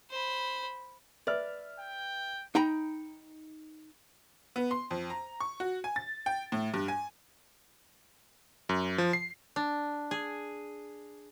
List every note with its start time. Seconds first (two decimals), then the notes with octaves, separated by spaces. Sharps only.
0.11 C5 B5
1.27 B4 D5 E5 F6
1.80 G5
2.55 D#4 G5 A#5 B5
4.56 B3
4.71 C6
4.91 F2
5.10 A#5
5.41 C#6
5.60 F#4
5.84 G#5
5.96 A6
6.26 G5
6.52 A2
6.74 G2
6.88 G#5
8.69 F#2
8.98 F3
9.13 C7
9.56 D4
10.11 G#4